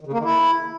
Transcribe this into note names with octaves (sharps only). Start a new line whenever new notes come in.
D#3
C#3
A#3
D#3
E4